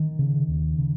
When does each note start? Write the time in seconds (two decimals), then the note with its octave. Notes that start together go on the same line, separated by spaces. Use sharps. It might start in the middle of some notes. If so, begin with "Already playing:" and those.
Already playing: D#3
0.19 C#3
0.48 D#2
0.78 C#3